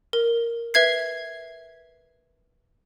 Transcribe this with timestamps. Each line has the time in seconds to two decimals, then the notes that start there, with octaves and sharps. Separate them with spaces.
0.13 A#4
0.74 B4 E5 G#6 C7